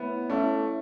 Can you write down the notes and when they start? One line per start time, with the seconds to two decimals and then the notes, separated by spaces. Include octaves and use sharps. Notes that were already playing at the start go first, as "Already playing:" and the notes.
Already playing: A3 B3 E4 C#5 E5
0.30 A3 C#4 E4 C#5